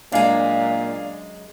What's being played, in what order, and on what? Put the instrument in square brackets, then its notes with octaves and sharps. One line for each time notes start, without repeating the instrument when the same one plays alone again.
[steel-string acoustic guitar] F#2 G#3 [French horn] A#2 [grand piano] D4 F5 G#5